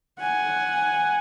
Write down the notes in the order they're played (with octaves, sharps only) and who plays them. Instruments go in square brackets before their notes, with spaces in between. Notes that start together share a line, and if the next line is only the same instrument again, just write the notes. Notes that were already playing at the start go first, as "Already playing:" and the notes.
[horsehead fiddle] F#5 G#5